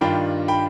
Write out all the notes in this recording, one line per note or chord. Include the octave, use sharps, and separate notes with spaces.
G2 D#3 G3 D4 F4 G5 B5
G5 B5